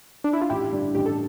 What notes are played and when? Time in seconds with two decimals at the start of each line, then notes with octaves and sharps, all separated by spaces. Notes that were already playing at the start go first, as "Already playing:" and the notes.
0.24 D4
0.33 E4
0.41 F4
0.50 A1 E4 G4
0.72 G2 D3 G3 D4
0.95 A1 G4
1.06 A4